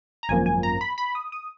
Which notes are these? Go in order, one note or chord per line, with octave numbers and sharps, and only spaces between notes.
A#5
G#1 F#2 F3 A#3 G#5
G#5
A#5
B5
B5
D#6
D#6